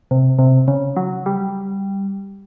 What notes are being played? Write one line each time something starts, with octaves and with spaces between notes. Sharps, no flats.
C3
C3
C#3
F#3
G3